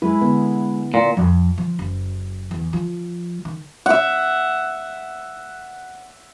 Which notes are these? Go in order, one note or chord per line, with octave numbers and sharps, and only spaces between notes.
G#3 E4 B4
D3 B3
A#2
F2
F3
F#1
E2
F3
D#3
E5 F#5